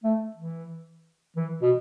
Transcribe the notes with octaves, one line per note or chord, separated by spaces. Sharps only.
A3
E3
E3
B2